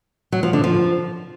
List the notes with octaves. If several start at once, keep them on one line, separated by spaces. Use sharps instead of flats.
F#3
F3
D3
F3